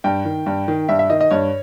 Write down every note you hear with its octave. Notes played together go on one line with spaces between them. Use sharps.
G2 G5
D#3
G2
D#3
G2 E5
E5
D#3 D#5
D#5
G2 C#5